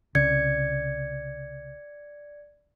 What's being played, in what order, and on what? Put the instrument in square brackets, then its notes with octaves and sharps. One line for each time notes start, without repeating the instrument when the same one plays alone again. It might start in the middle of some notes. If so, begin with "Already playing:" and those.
[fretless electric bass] C2 C#3 [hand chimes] D5 G#6 C#7